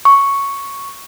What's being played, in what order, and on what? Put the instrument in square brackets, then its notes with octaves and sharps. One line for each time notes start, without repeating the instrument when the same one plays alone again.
[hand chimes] C#6